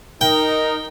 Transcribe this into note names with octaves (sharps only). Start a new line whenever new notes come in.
D#4 A#4 G5